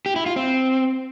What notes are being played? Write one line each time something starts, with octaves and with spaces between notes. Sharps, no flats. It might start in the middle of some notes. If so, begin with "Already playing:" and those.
G4
E4
F4
C4